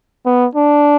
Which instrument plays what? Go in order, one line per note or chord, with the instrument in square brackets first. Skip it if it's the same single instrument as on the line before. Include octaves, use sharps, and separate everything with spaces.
[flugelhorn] B3
D4